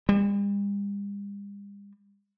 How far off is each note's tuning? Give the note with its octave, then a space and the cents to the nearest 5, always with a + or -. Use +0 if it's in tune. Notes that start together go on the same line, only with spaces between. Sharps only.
G3 +45